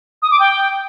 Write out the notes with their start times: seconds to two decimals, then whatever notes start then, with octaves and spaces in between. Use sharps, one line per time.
0.22 D#6
0.31 D6
0.40 G5